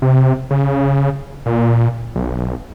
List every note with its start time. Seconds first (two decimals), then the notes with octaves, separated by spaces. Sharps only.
0.02 C3
0.51 C#3
1.46 A#2
2.15 B1